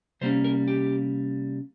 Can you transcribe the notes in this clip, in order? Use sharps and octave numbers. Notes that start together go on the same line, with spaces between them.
C3 G3 A#3 C#4 C5
A#4
G4